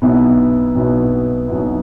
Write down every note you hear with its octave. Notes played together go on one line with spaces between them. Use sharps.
B1 B2 B3 E4
B1 B2 B3 E4
B1 B2 B3 E4